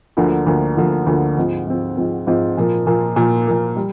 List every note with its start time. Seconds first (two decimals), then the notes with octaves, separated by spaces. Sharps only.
0.17 D2 D3 F3 A#3
0.46 D2 D3 F3 A#3
0.77 D2 D3 F3 A#3
1.07 D2 D3 F3 A#3
1.37 G#2 F3 C4 F4
1.67 G#2 F3 C4 F4
1.97 G#2 F3 C4 F4
2.27 G#2 F3 C4 F4
2.57 A#2 F3 A#3
2.86 A#2 F3 A#3
3.16 A#2 F3 A#3
3.47 A#2 F3 A#3
3.76 G3